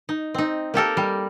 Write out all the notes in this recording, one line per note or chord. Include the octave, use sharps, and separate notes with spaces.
D#4
C4 D#4
A#3 G4 A4 A#4
G3